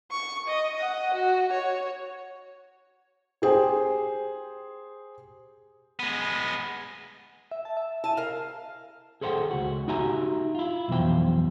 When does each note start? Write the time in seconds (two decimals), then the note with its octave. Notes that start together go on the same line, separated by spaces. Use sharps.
0.12 C#6
0.48 D#5
0.77 D#5 F#5
1.14 F#4
1.53 C#5
3.42 G4 G#4 C5 G5
6.00 G#3 B3
7.51 E5
7.65 A5
7.77 E5
8.04 E4 G#5 A5
8.17 A#4 F5
9.21 G#4 A4 C5 D5 F#5 G5
9.51 C#2 F#4
9.88 D#4 F#4 G4 E5 G#5 A#5
10.55 E4 F4
10.88 B1 F2 B2 E3 C5 G5